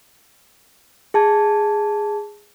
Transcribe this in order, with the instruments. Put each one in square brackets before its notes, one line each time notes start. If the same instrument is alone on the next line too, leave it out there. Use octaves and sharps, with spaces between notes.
[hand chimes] G#4 A5 G#6